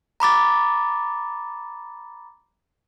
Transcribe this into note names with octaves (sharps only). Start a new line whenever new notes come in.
A#5 B5 D6 A6